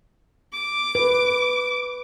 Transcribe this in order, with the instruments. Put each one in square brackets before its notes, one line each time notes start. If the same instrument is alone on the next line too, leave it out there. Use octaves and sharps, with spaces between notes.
[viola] D6
[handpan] B4